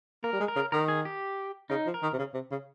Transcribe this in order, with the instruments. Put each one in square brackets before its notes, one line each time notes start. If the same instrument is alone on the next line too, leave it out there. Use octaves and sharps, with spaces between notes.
[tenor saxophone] A#3 [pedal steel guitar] A#4
[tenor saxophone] G3
G#3
[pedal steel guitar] A#4
[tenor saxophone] C#3
[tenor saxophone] D#3 [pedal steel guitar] A#4
[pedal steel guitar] G#4
G4
[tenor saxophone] C#3 [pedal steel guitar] D#4
[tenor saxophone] F3
[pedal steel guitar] A#4
[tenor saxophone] D#3
C3
C#3
C3
C#3